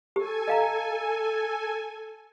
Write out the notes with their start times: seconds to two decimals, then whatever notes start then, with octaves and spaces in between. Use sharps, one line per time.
0.16 G4 A4 G#5
0.48 D#5 F5 A#5